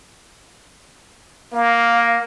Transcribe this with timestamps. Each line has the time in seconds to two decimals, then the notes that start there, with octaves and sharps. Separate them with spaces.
1.53 A#3 F5